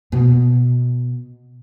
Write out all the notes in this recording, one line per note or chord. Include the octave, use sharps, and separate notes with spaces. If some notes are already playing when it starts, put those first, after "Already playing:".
B2 B3